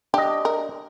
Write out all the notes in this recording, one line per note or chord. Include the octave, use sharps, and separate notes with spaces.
D4 G4 D#5
A#4